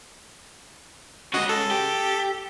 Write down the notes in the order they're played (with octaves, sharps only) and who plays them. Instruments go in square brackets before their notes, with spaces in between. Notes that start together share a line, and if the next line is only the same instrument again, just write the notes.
[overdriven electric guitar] C#3 G#3 [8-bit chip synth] F#4 D#5
[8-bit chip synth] A4
[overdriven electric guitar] G4